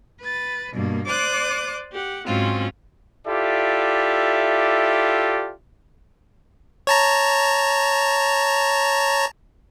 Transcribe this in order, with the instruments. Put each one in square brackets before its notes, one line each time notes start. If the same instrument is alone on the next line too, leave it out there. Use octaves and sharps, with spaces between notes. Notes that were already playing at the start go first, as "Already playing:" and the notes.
[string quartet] B4 A6
G2 B2 A#3
C5 D5 D6 D#6 F#6
G4 F#5
G#2 F#3 C4 C#4 F4
[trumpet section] E4 F4 G4 A4 D5 E5
[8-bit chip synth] C#5 A5 A#5